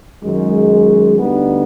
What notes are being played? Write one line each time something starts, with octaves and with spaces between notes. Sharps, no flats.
F#2 D#3 G#3
D2 D3 G3 B3 D#4